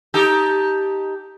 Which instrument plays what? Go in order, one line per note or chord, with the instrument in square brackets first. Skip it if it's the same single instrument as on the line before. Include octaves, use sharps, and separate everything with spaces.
[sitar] D#4 G4 A4